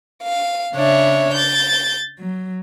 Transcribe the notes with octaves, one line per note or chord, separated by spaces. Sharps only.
F5
C#3 D4 C#5 E5
G6 A6
F#3